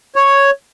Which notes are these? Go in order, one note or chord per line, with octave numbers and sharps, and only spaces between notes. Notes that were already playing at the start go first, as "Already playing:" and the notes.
C#5